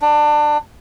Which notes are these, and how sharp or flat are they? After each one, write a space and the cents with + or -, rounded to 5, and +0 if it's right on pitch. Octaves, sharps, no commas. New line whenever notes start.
D4 +25